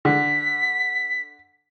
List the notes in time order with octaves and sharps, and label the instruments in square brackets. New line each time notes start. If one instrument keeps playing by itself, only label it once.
[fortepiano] D3 [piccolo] B6